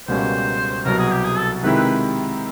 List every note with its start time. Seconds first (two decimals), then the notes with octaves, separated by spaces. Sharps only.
0.08 C#2 B2 G3 A#3 C#4 C5
0.85 C2 B2 F#3 A#4
0.98 G#4
1.11 G4
1.24 G#4
1.37 A4
1.63 C3 D#3 G#3 C4 E4 B4
1.76 B4